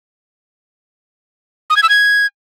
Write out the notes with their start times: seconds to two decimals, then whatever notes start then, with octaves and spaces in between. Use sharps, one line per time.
1.70 D#6
1.76 G#6
1.83 E6
1.89 G#6